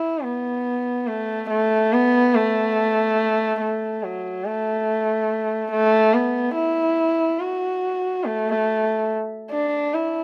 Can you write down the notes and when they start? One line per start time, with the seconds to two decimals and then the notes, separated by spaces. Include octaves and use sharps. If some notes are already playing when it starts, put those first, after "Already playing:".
Already playing: E4
0.23 B3
1.07 A3
1.50 A3
1.92 B3
2.34 A3
3.61 A3
4.03 F#3
4.45 A3
5.72 A3
6.14 B3
6.55 E4
7.40 F#4
8.25 A3
9.51 D4
9.94 E4